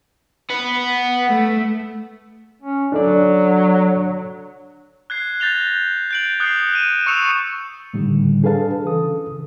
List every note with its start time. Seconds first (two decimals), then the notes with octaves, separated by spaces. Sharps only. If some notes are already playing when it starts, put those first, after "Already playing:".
0.50 B3
1.28 A3
2.62 C#4
2.92 F#3 D4 A4 D5
5.10 F#6 G#6 C7
5.40 F#6 G6 A6 A#6 F7 G7
6.11 G6 D7 F#7
6.40 D#6 F#6 C7 C#7
6.73 F#6 D#7 E7
7.07 C#6 D#6 E6 C#7 E7 F7
7.94 A2 D3 D#3 G3
8.43 D4 G#4 A4 B4 F5 A5
8.85 C#3 E3 A4 D#6